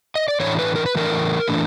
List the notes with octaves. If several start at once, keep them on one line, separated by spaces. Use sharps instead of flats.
D#5
D5
A2 E3 A3 D4 C#5
B4
A#4
B4
A2 E3 A3 D4 A#4
A2 E3 A3 D4